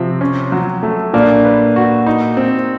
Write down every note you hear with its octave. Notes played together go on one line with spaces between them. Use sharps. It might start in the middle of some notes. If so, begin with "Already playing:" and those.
Already playing: C3 F3 C4
C#4
F#3
A3
A#2 A#3 D4
B4
F#4
D#4
C4